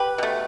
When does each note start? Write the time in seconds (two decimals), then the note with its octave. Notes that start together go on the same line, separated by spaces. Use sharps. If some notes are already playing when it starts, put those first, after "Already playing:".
Already playing: G4 B4
0.18 B2 A3